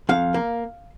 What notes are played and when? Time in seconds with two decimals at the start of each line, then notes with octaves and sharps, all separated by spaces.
0.09 F2 F5
0.34 A#3